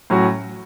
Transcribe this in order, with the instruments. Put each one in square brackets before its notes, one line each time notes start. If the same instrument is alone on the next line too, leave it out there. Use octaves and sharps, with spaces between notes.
[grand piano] A2 F#3 C#4 F#4